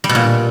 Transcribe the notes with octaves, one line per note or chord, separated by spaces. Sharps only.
G3
B2
A#2